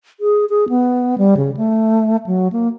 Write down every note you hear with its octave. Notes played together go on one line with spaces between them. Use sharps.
G#4
G#4
B3
G3
C#3
A3
F#3
A#3